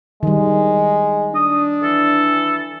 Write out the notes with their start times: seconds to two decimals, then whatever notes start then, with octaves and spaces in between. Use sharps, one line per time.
0.23 D#3 G3 G#3
1.35 D4 D#6
1.83 E3 A4